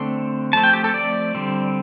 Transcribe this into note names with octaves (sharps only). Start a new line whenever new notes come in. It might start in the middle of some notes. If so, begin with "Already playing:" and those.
Already playing: D3 A3 C4 C6
F3 A3 C4 A5
G5
G4
A4
D5
D3 G3 C4